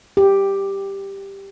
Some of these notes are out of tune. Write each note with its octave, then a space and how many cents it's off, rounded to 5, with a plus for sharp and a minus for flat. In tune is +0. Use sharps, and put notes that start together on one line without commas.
G4 +5